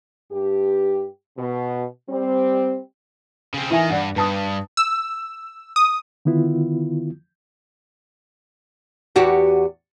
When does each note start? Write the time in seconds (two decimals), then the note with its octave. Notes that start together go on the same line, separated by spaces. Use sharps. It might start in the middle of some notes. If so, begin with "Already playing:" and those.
0.32 G2 G4
1.37 B2
2.09 G3 C4
3.54 C#3 C4
3.71 D#3 E3 E5 G#5
3.90 G2 D5 F#5
4.16 G2 B4 A5 D#6
4.77 E6
5.76 D#6
6.25 D3 D#3 B3 E4 F4
9.16 E2 F#4 G4